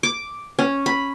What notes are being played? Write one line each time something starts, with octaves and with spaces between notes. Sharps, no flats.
D6
C#4
B5